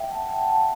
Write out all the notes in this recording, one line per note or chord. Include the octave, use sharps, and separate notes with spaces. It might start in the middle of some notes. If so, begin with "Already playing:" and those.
Already playing: E5 G5
F#5 A5
E5 G5
F#5 A5